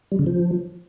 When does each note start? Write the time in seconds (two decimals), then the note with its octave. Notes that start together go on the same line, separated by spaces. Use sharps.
0.12 G3
0.19 C#3
0.26 F3